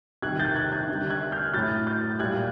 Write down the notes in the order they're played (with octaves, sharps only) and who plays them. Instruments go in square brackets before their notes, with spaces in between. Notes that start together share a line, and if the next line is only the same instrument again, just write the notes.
[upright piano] C3 D#3 G3 F#6 G#6
G6 A6
F#6 G#6
F#6 G#6
D3 G3
F#6 G#6
F6 G6
A2 F#3 G6 A6
G6 A6
A#2 G3 F#6 G#6